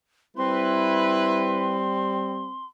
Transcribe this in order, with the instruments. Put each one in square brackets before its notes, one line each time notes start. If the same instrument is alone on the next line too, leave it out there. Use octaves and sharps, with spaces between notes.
[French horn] G3 [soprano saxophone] C4 [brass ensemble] E4 B4 [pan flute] C6